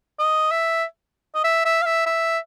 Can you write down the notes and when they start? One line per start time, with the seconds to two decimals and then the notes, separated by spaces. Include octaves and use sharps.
0.19 D#5
0.51 E5
1.34 D#5
1.44 E5
1.65 E5
1.82 F5
1.86 E5
2.06 E5